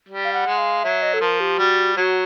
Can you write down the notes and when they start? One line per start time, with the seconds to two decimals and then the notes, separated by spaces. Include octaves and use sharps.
0.08 G3
0.24 F5
0.33 F#5
0.46 G#3
0.58 F5
0.83 F#3 E5
1.02 D#5
1.14 A4
1.21 F3 A#4
1.40 G4
1.59 G3 F#4
1.97 F#3 F#4